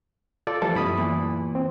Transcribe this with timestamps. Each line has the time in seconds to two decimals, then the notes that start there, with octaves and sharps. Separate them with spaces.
0.47 F4 A4 D5
0.62 E3 F3 G3 A3 A4
0.75 F#2 B2 G3 E4 B5 D#6
0.97 E2 A#2 E3
1.55 C4